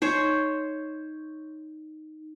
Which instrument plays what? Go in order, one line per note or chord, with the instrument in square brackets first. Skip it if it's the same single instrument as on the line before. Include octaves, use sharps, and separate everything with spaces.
[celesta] D#4 [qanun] C5 C#5